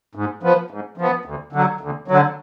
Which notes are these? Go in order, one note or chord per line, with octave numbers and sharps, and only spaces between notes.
G#2
F3 B3
G#2
F3 B3
D2
D3 F#3
D2
D3 F#3